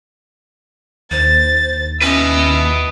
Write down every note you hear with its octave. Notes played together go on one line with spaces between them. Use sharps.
D#2 C5 A6
C#4 E4 B4 D#5 E6